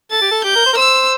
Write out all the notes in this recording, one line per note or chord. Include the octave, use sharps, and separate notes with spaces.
A4 A6
G4
A4
G4 G6
A#4
C5
A#4
C5 E6